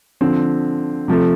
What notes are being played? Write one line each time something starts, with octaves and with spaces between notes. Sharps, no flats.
D3 F3 C4
C3 F3 A3